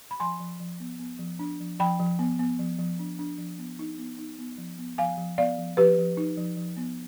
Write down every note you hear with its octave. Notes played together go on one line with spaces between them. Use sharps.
B5
F3 G#5 C6
F3
F3
B3
B3
F3
D4
F3
F3 G5 B5
F3
B3
B3
F3
F3
D4
D4
F3
B3
D#4
B3
D#4
B3
F3
B3
F3 F5 G#5
F3
B3 D5 F5
F3
F3 G4 B4
F3
D#4
F3
F3
B3